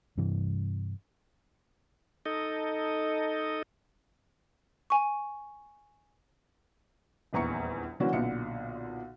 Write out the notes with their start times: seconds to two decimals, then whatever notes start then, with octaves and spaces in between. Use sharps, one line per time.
0.18 G2 C3 E3
2.26 D#4 A4 D#5
4.90 G#5 C#6
7.33 D#1 A#1 E2 A#5 C#6 C#7
8.00 D3 E3 F#3 A#3 C#4 F#4
8.13 B1 A#2 D3 B3 C#7